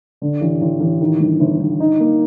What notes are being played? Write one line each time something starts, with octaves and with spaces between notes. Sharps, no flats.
D3
A1
A1
A1
D#3
G1
G1
G1
D#4
A#3